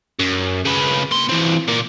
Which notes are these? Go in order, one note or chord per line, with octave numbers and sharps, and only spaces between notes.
F#2
C#3 B4
A#2 C6
E3 C4
A#2 A#3